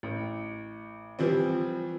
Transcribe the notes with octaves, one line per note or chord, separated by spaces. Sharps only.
A1
E3 F3 G3 C4